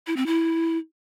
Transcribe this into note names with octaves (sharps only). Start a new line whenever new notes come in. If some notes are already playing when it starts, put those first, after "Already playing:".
E4
C4
E4